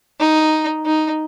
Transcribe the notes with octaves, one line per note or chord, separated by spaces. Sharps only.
D#4
D#4